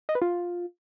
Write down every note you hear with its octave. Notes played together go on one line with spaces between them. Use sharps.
D#5
B4
F4